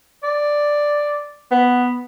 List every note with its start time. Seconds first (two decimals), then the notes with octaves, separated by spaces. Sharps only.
0.24 D5
1.51 B3